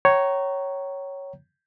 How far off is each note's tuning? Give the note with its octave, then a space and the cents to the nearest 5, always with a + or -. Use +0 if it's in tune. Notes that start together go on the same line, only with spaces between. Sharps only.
C#5 +0 G5 -45 A#5 +0